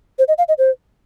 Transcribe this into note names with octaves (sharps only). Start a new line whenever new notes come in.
C5
D#5
F5
D#5
C5